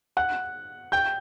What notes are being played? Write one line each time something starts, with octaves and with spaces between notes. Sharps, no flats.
F#5 F#6
G5 G6